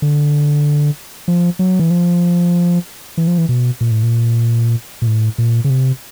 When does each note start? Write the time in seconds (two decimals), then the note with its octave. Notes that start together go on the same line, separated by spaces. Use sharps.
0.02 D3
1.28 F3
1.59 F#3
1.79 E3
1.90 F3
3.17 E3
3.27 F3
3.38 E3
3.49 B2
3.81 A#2
3.91 A2
4.03 A#2
5.02 A#2
5.07 A2
5.38 A#2
5.64 C#3
5.70 C3